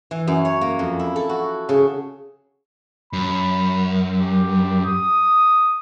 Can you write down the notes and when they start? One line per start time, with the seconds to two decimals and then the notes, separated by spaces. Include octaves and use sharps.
0.11 E3
0.27 F#2
0.45 C#5
0.61 A#3
0.79 F2
0.99 E4
1.16 A4
1.29 F#4
1.69 C#3
3.13 F#2 B5
4.20 G4
4.85 D#6